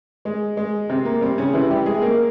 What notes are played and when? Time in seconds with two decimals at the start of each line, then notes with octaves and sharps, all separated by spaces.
0.25 G#3
0.57 G#3
0.89 C3 C4
1.05 A#3
1.21 G3 C4
1.38 C#3 C#4
1.53 C3 E3 E4
1.70 G3 G4
1.86 G#3 G#4
2.02 A#3 A#4